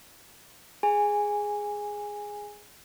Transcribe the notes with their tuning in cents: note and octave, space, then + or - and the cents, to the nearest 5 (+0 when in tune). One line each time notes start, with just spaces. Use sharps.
G#4 +0 G#5 -10